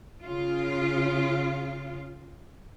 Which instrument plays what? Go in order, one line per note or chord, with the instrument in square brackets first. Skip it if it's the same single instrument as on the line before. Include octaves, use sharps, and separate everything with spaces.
[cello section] C#3 F4